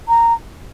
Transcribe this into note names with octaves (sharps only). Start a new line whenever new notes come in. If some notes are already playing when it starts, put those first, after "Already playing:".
A#5